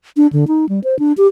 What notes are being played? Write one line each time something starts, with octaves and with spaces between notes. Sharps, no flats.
D4
D3
D#4
G3
C5
D4
G4